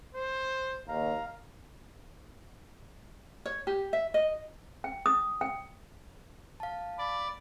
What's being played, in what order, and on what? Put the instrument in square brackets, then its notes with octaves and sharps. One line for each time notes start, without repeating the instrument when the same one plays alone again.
[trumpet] C5
[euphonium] D#2 [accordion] F5 [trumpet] A#5
[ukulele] C#5
G4
E5
D#5
[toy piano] G5
D#6
G5
[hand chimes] F5 A5
[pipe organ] D5 [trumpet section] B5